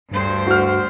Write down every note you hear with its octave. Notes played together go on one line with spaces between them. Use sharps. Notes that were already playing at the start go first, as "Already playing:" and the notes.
D2 G2 G3 C5
F#4 F6